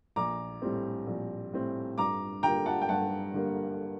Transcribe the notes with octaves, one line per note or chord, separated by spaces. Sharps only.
A#1 A#5 D6
A2 G3 C4
A#1
A2 G3 C4
G2 A#5 D6
D3 G3 A#3 G5 A#5
F#5 A5
G5
G2 F#5 A5
D3 G3 A#3